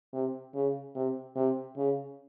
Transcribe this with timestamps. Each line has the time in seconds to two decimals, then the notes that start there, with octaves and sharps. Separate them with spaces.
0.13 C3
0.55 C#3
0.95 C3
1.36 C3
1.77 C#3